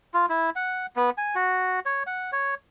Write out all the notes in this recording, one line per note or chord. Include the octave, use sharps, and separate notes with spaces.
F4
E4
F#5
B3
G#5
F#4
C#5
F#5
C#5